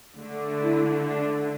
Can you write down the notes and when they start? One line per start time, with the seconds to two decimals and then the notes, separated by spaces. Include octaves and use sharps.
0.16 D3 A3 D4
0.61 E4
1.07 D4